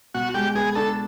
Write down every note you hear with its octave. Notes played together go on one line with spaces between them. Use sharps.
B2 F#4
G#3 G4
B3 G#4
D4 A4